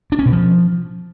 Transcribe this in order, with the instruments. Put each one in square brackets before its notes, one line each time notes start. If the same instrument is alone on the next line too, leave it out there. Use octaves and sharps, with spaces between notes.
[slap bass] D4
C#4
B2
F3